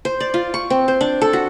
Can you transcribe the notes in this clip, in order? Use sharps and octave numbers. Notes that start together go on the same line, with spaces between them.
C5
D5
F4
C#6
C4
C5
D4
A4
F#4